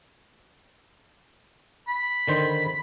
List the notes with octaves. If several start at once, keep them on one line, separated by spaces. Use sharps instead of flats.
B5
D3 D#3 C5